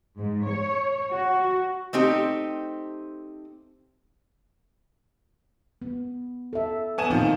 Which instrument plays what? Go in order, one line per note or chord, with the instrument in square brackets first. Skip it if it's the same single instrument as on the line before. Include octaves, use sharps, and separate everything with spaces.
[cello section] G#2
C#5
F#4
[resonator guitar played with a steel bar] A3 C4 D#4 G4
[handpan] B3
A4 E5
[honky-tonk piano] B3 G#5 E7
[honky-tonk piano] A#2 D#3 F3 [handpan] A#3 C4 D#4